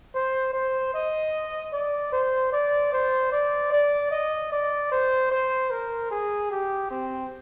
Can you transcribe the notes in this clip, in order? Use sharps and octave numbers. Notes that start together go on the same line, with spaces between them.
C5
C5
D#5
D5
C5
D5
C5
D5
D5
D#5
D5
C5
C5
A#4
G#4
G4
C4